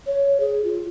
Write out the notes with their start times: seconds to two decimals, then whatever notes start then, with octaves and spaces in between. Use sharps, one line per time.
0.06 C#5
0.40 G#4
0.64 F4